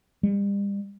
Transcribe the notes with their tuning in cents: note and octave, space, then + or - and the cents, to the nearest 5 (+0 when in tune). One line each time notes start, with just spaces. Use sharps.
G3 +40